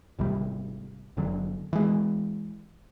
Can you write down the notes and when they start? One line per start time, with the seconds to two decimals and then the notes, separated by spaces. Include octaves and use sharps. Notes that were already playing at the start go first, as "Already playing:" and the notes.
0.19 G#1 C#2 C3 G3
1.17 F#1 D3 F#3
1.73 E3 G#3